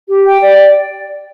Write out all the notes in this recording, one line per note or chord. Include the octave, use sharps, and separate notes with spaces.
G4
G5
D5